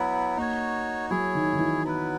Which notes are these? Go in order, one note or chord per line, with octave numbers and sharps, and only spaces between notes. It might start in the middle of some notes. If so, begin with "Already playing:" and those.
Already playing: F#3 B3 E4
A#3 D#4 F#4 C#5
F#3 E4 G#4 C#5
D#3
D#3
E3
F#3 B3 E4 B4